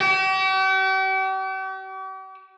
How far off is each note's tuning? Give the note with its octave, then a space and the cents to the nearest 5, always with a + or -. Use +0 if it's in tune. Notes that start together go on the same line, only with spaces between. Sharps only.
G4 -45